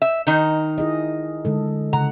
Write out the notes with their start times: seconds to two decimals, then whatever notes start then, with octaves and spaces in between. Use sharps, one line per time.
0.02 E5
0.27 D#3 D#4
0.78 E4 G#4 D#5
1.45 D3 G#3 A4
1.93 C#3 F#5 A#5